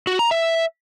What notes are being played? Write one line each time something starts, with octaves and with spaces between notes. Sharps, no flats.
F#4
A#5
E5